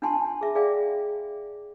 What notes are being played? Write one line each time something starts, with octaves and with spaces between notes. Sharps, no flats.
D4 F4 F#5 G#5 A5 C6
G#4 E5
G#4 D5 E5 F5 G5